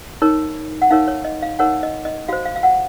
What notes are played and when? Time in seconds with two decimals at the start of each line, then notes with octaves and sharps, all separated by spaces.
0.22 D#4 A#4 C#5
0.82 F#5
0.91 D#4 A#4 C#5 F5
1.08 C#5
1.25 D#5
1.42 F5
1.59 D#4 A#4 C#5 F#5
1.83 D#5
2.05 D#5
2.28 F#4 C5 F5
2.45 F5
2.56 F5
2.63 F#5